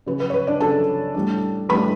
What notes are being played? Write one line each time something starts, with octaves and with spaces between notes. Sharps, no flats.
C#3 F#3 C#4 B4
B4
C#5
B4
D4 D5
C#3 F#3 C#4 A4 A5
A2 G3 D4
A2 G3 D4 B4 B5